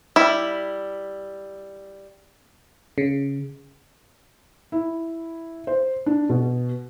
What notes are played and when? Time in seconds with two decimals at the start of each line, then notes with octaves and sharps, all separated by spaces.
0.16 G3 E4
2.98 C#3
4.72 E4
5.67 C5
6.06 D4
6.29 B2